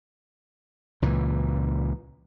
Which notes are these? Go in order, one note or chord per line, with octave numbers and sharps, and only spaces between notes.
C#2 A#2 E3